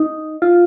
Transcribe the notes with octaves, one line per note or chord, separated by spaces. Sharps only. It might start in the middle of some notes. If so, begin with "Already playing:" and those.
Already playing: D#4
F4